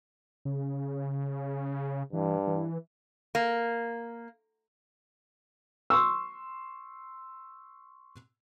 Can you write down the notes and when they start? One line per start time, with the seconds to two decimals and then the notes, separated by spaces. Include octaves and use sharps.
0.45 C#3
2.13 G2 E3
2.47 E3
3.35 A#3
5.90 C6 C#6 E6